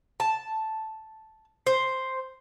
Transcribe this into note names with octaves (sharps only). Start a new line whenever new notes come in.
A5
C5